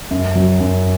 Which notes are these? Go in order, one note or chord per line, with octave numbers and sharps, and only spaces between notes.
F#2
F#3
F#2